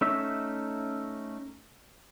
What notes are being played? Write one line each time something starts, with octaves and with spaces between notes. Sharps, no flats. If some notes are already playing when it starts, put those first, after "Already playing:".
A3 C#4 D#4 E5